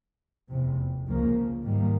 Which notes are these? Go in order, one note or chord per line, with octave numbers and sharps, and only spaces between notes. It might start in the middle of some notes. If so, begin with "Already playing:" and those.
F1 E2 C3
C#2 C#3 F3 A#3
G#2 D#3 G3 A#3